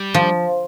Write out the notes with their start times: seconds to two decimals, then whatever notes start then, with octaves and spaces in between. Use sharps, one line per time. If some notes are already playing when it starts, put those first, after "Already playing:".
Already playing: G3
0.14 F3